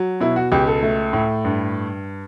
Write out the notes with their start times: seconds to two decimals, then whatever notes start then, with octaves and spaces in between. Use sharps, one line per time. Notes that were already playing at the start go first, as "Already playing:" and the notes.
Already playing: F#3
0.21 B2 E4
0.36 F#4
0.52 C#2 G4
0.67 A4
0.83 A3
1.13 A2
1.44 G2